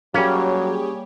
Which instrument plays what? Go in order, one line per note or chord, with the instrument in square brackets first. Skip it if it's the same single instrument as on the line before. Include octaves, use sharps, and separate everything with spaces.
[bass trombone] F#3 [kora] G3 A#3 [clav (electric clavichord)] C#4 [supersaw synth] G4 G#4 C#5